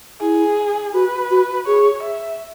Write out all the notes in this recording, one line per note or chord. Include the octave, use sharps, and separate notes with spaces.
E4 G#4
F#4 B4
F#4
G#4 C#5
E5